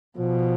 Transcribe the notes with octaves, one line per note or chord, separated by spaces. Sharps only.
B2 F3